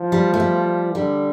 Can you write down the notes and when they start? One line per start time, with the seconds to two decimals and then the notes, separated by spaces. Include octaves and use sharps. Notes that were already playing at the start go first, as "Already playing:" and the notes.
Already playing: F3
0.12 G3
0.34 A3
0.40 G3
0.95 D3 G3